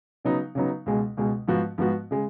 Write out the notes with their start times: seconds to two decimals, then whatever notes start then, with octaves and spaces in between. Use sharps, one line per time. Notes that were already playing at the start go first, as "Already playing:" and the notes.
0.25 C#3 F#3 B3 D#4
0.55 C#3 F#3 B3 D#4
0.86 C#2 B2 G#3
1.17 C#2 B2 G#3
1.48 G#2 F3 B3 F#4
1.78 G#2 F3 B3 F#4
2.11 C#3 G#3